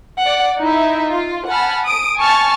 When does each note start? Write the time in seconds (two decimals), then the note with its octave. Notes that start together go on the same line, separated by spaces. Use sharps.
0.19 D5 F#5
0.60 D#4 E4 E5
1.07 F4
1.48 F#5 G#5 A5 B5 F6
1.86 D#6 D7
2.20 G#5 A5 C#6 F6 A6